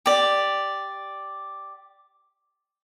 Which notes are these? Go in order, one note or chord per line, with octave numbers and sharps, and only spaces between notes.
G4 D5